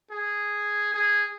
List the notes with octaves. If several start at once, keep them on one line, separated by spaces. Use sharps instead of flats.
G#4
G#4